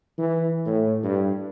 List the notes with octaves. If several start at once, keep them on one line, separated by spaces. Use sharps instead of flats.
E3
A2
G2